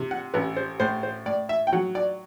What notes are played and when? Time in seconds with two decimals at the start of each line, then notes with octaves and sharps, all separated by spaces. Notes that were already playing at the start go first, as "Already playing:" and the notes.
Already playing: C3
0.11 F#5
0.34 A1 B4
0.57 C5
0.80 A2 C5
1.03 C5
1.26 A2 D5
1.49 E5
1.67 G5
1.72 F#3 F#5
1.95 D5